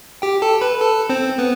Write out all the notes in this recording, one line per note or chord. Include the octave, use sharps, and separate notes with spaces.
G4 G5
A4 A5
B4 B5
A4 A5
C4 C5
B3 B4